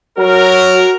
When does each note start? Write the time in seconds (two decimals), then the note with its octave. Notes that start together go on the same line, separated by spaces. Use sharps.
0.18 F#3 F#4 A#4